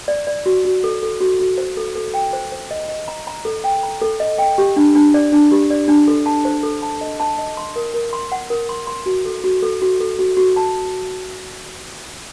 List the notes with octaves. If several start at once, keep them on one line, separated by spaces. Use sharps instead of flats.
D5
D5
F#4
F#4
A4
A4
F#4
F#4
C5
A4
A4
G5
C5
C5
D#5
D#5
A#5
A#5
A4
G5
A#5
A4
D#5
G5
G4
D4
D4
D5
D4
G4
D5
D4
A4
A5
C5
A4
A5
D#5
A5
D#5
C6
A#4
A#4
C6
F#5
A#4
C6
C6
F#4
A4
F#4
A4
F#4
A4
F#4
F#4
A5